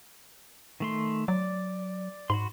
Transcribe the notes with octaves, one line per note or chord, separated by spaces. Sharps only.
D#3 A3 C6
F#3 D5
G#2 F#4 B5 C6